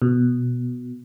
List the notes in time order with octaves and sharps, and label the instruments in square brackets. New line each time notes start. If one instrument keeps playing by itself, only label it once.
[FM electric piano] B2